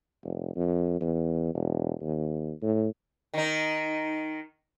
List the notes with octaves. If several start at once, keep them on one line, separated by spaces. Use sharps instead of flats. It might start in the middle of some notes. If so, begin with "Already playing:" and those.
F1
F2
E2
E1
D#2
A2
D#3 D#4